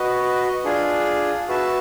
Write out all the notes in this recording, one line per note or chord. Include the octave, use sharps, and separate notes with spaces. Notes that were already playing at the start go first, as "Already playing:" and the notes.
Already playing: F#4 B4 D#5
D4 F4 G#4
F#4 B4 E5 A5